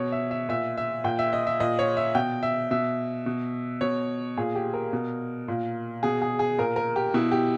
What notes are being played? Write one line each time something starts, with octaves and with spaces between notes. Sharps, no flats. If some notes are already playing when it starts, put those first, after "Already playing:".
Already playing: B2 C#5
E5
E5
A#2 E5
E5
A#2 G5
E5
D#5
E5
A#2 D#5
C#5
E5
B2 G5
E5
B2 E5
B2
B2 C#5
A#2 G#4
G4
A#4
B2
A#2
B2 G#4
G#4
G#4
A#2 A#4
A#4
G4
B2 E4
G4